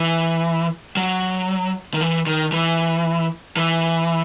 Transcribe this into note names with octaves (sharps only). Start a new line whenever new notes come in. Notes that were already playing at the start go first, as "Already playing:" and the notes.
Already playing: E3
F#3
D#3
E3
D#3
E3
E3